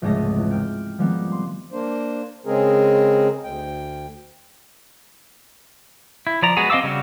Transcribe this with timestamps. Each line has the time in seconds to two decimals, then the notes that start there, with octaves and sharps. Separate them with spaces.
0.02 F1 C#2 G#2 G#3 A3 D#5
0.36 E2
0.51 G5 F6 G6 D7
0.99 D#3 F3 G3 G#3 B3 C4
1.32 C6
1.72 A#3 D4 C5
2.46 C#3 G#3 C4 G#4 A#4
3.44 D2 G5
6.27 E4
6.42 F3 D5 A#5
6.57 G#3 B3 F#4 G#4
6.70 C4 D#5 F5 D6 E6
6.84 C#3 G3 F#4